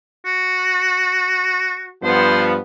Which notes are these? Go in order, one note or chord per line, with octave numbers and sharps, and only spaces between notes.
F#4
G2 F3 B3 C5